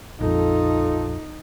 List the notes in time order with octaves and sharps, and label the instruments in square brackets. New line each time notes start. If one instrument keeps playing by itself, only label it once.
[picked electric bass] A#1 F2 [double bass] D#4 [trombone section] F4 A4